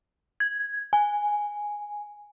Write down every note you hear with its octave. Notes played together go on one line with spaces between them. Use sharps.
G#6
G#5